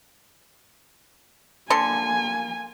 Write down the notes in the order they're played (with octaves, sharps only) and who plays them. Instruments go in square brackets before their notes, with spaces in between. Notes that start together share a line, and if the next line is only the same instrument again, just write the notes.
[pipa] D3 A4 C6 [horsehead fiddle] A#3 G#5